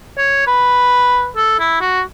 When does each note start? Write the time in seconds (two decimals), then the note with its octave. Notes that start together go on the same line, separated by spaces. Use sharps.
0.17 C#5
0.47 B4
1.36 A4
1.60 E4
1.81 F#4